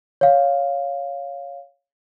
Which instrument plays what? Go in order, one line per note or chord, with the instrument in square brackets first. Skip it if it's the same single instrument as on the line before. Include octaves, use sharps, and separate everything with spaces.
[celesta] C#5 F5